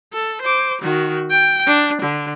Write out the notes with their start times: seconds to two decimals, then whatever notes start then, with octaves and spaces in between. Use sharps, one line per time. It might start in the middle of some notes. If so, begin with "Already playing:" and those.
0.13 A4
0.42 C5 D6
0.82 D#3 F#4
1.30 G5
1.66 D4
2.02 D3